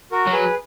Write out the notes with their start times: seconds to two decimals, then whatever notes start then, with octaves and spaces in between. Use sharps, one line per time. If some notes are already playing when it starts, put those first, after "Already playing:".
0.12 F#4 A#4
0.27 F#3
0.32 G#4 B4